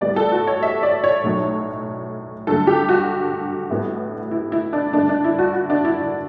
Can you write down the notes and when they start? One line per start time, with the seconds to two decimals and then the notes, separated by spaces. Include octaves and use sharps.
0.01 A1 A2 G3 B3 D5
0.16 A4
0.32 F#4
0.47 C#5
0.63 E5
0.83 D5
1.04 C#5
1.24 B1 A2 F#3 A3
2.47 G2 D3 F#3 A3 A4
2.67 G4
2.89 F#4
3.70 A1 A2 G3 B3
4.31 E4
4.52 E4
4.73 D4
4.93 G2 D3 A3 D4
5.09 D4
5.24 E4
5.39 F#4
5.55 F#4
5.70 D4
5.85 E4
6.01 E4